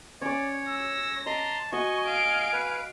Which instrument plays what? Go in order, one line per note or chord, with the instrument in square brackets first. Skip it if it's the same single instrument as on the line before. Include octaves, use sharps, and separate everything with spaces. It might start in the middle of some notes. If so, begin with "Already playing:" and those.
[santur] C#4 D6 [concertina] C#5 [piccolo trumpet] D5
[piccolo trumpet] E6 [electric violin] A#6
[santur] D#5 D6 [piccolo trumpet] A5 [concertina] A#5 C6
[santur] F#4 F#5 [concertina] D#5 [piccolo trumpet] G#5 [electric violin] C#6
[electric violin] F5 D7
[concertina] B4